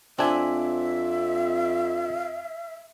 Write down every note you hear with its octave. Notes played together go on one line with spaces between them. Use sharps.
F2 C4 D4 E5 G#5